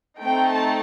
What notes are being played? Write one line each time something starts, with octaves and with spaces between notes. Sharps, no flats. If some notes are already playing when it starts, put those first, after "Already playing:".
A3 C4 D#4 G5
A5